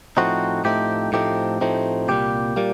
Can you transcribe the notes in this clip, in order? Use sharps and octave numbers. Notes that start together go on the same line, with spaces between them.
A2 F3 A3 C4 D#4 F#4
A2 F3 A3 C4 D#4 G4
A2 F3 A3 C4 D#4 G4
A2 F3 A3 C4 D#4
C2 A#2 G3 A#3 G4
A#2 G3 A#3